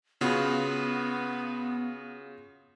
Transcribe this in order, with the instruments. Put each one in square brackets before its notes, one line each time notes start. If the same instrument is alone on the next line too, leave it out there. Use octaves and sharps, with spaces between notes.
[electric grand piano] C#3 F4 F#4 [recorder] B3